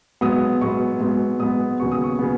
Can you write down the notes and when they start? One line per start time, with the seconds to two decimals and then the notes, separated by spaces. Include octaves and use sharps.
0.21 G#2 F#3 B3 D#6
0.61 G#2 F#3 B3 C#6
1.00 G#2 F#3 B3
1.40 G#2 F#3 B3 D#6
1.80 D#2 C#3 F#3 B3 C#6
1.92 D#6
2.04 C#6
2.19 C#3 F#3 B3